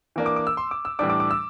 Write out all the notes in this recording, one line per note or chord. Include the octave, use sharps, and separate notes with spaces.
E3 A#3 D4
D6
D6
E6
C6
D6
E6
A2 E3 G3 D4 D6
D6
D6
E6